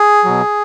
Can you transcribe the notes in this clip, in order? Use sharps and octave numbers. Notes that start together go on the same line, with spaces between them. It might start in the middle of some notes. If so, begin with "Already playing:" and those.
Already playing: G#4
B2 F#3